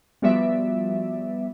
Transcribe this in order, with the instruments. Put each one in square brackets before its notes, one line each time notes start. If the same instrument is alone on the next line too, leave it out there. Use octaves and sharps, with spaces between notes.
[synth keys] F3 G3 B3 F#4 D5 E5